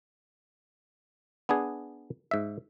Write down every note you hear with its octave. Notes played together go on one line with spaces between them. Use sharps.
B3 D4 G#4
G#2 E5